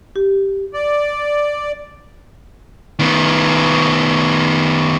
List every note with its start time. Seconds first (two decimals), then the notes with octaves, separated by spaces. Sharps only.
0.16 G4
0.73 D5
2.99 D#3 B3